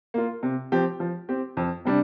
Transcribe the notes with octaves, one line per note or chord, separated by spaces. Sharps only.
A#3 F4
C3
F3 C4 G4
F3
C4 G4
F2
C3 G3 D4